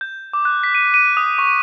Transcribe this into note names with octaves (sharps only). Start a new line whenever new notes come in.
G6
D6
F#6
B6
D#7
D#7
D#6
C#6